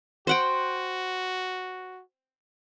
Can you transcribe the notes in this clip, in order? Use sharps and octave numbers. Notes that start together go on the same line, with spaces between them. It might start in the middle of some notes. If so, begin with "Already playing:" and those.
F#4 C5 F#5 G5